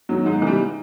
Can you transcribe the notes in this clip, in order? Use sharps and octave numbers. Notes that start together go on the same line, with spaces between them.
D#3 F#3
G#2 D#4
E3 G3